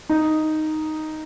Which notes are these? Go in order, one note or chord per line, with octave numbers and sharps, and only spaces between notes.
D#4